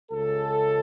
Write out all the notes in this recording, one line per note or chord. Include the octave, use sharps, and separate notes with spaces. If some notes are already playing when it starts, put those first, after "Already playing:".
C#2 C#3 G#3 A4